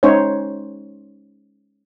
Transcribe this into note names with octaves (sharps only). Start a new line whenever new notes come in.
G#3 C#4 D#4 C5 C#5